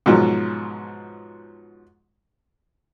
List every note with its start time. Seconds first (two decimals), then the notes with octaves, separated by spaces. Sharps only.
0.06 G#2 B2 F3 F#3